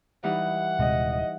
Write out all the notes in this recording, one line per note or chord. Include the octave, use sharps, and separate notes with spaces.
E3 G3 D#4 F#5
D#1 C3 G#3 D#5